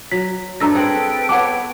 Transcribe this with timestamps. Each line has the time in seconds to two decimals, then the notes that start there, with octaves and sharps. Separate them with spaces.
0.12 F#3 B6
0.60 G2 A3 A#5 E6 A#6
0.75 C4 G#4 A4 B4 F#5 G5
1.29 B3 C#5 F#5 A5 D6